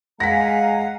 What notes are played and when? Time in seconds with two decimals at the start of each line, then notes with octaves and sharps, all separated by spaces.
0.20 G#3 F5 F#5 G#5 A#5 A#6 B6